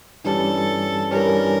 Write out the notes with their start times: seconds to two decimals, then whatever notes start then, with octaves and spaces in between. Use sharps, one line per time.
0.24 G2 E3 G3 C#4 A4
1.11 G2 E3 G3 C#4 A#4